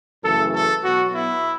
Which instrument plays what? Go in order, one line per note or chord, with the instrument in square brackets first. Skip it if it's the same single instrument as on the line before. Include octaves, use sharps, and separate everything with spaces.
[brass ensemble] F#2 C#3 E3 A3 A4
A4
B2 F#3 B3 F#4
E4